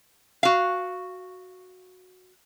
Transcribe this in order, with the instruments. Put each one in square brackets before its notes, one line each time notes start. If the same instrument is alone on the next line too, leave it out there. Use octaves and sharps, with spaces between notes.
[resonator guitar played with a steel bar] F#4 F5